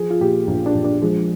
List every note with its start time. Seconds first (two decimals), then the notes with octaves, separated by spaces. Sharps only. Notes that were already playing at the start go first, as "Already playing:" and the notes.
Already playing: F3 G#4
0.10 F4
0.21 A#2 G4
0.47 A#1 F4
0.66 D4
0.74 A#1
0.84 D4
1.02 F3 G#3